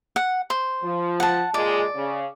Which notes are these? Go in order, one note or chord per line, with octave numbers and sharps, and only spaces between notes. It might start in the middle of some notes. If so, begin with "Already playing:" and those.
F#5
C5
F3
F#5 A5
A#2 G#3 D5
C#3